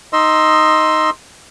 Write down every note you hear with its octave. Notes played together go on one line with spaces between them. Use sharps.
D#4 D#5 C6 E6